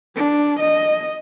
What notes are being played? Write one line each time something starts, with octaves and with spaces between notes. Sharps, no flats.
D4
D#5